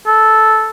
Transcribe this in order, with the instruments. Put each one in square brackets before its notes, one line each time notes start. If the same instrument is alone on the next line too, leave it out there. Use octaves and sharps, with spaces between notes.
[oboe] A4